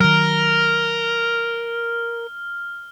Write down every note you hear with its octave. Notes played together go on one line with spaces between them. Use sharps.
D#3 F#3 A#4 F6